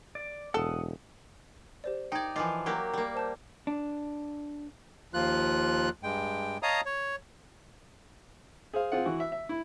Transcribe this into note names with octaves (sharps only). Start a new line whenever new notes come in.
D5
E1 A4 F#5 D#6
G4 C5 D5
D#4 D5 G5 G#6
E3 F3 F4 D#5 D6
F#3 A#3 G4
G3 A#3
C5 A5 G6
D4
D#2 F3 F4 F#6
G2 G#3 G5
C#5 D#5 F5 A5 A#5 D#6
C#5
G#4 C5 F5
C4 F4 G#4 F#5
E3 F#4
E5
E5
E4